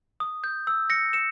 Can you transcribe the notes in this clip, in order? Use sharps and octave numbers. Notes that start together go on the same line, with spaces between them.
D#6
G6
E6
A#6 C#7
C#7 E7